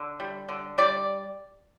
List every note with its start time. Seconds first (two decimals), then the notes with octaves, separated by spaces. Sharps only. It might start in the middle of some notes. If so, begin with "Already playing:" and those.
Already playing: D3
0.20 G3
0.49 D3
0.78 G3 D5